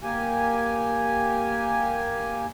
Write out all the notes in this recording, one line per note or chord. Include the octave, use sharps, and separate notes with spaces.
A#3 G4 G#5